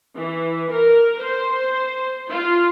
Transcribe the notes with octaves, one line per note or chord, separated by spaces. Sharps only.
E3
A#4
C5
F4